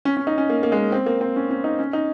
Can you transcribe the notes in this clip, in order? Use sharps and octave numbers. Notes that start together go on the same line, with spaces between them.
C#4
C#4
D#4
C#4
A#3
A#3
G#3
A#3
C4
A#3
C4
C#4
C#4
D#4
C#4
D#4